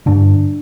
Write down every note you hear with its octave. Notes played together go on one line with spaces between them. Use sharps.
G2 D3 D4